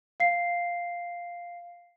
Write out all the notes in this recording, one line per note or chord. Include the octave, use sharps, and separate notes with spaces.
F5 C7